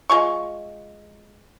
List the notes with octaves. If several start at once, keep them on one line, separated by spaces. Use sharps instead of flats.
G#3 F4 C#6